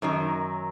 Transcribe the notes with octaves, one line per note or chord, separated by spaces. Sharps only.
F#2 D#3 F#3